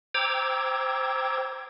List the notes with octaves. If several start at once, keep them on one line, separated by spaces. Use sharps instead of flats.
C5 G5 A#5 D6 E6 G#6